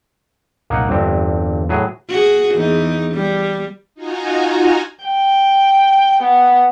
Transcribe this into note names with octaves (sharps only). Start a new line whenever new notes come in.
C2 A#2 F#3 A#3 D#4 F#5
G1 E2 G2 B3 C4
A2 F#3 G#4
F#4 G#4
E2 D#4
G3
D#4 F4 F#4 G#5 A#5
G5
B3